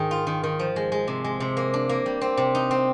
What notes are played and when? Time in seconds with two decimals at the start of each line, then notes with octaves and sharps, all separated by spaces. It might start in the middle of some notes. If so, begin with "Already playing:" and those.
Already playing: G#2 D#3 G#3 D#4
0.11 F4
0.27 D#3
0.43 D#3
0.59 F3
0.76 G#3
0.92 G#3
1.07 C3
1.24 G#3
1.40 C3
1.57 A#3
1.74 D4
1.89 A#3
2.06 G3
2.21 C4
2.37 C3
2.55 D#4
2.71 C4